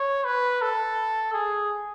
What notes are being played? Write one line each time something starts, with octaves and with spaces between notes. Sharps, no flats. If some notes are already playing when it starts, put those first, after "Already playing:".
Already playing: C#5
B4
A4
G#4